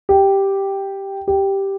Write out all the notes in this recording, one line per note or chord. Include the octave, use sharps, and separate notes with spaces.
G4
G4